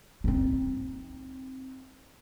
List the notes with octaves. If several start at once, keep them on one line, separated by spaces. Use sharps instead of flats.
C4 D#4